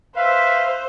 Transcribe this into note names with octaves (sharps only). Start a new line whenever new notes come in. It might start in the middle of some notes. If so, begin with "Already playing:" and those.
B4 C5 E5 F5